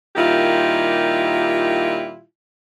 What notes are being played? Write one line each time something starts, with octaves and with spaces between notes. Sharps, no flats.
A#2 D#3 G3 E4 F4 G4